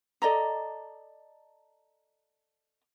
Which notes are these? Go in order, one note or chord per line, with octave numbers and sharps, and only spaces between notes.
A4 D5 D#5 A#5